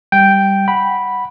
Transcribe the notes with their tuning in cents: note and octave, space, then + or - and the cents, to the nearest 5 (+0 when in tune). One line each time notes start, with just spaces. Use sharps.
G3 +0 G5 +0
F#5 +0 B5 -5